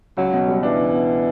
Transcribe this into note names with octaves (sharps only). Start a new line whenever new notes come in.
C#2 F#3
B2
G3
E3 D4
C#2
B2